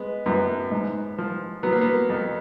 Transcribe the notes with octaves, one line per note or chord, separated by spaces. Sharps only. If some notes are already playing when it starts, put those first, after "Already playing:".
Already playing: G#3 B3
F#2 B3
G#2
F3
F#3 B3
A#3
B3
F2